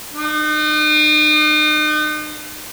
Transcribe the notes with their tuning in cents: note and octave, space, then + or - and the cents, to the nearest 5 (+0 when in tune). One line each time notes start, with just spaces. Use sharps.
D#4 -40